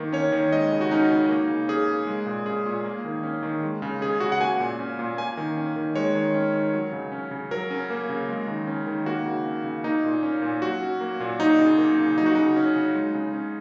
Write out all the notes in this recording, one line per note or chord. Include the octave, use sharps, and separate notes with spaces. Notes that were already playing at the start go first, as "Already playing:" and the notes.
Already playing: D#3 A#3
C#4 C#5
D#3
G#3 D#5
C#3
F#4
C#4 D#4
C#3
A#3
C#3
C#4 G#4
C#3
G#3
A#2
C#4 G#4
A#2
A#3
D#3
C#4
D#3
G#3
C#3
C#4 G#4
C#3 F#4
F#5
A#3 G#5
A#2
C#4
A#2
A#3 G#5
D#3
C#4
D#3
G#3 C#5
D#3
C#4
D#3
F#3
C#3
C#4
C#3
F#3 A#4
C#4
A#3
C#3
G#3
D#3
C#4
D#3
A#3 F#4
C#3
C#4
C#3
A#3 D#4
A#2
C#4
A#2
F#3 F#4
C#4
A#3
A#2
F#3 D#4
C#3
A#3
C#3
F#3 D#4
F#4
C#3 D#4
C#4
C#3
G#3
C#3
C#4